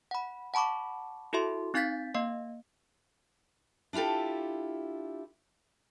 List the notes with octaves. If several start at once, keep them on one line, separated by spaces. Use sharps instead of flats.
F#5 B5
F#5 A5 B5 C#6 D6
E4 F#4 A4 E5 C6
C4 D#4 F5 G6 A6 B6
A#3 D#5 F5
D4 E4 F4 G4 A4